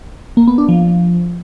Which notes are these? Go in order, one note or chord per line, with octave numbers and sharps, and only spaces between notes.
A#3
B3
D4
F3